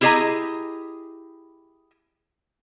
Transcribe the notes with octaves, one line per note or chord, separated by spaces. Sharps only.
E4 G4 G#4 D#5 G#5 A#5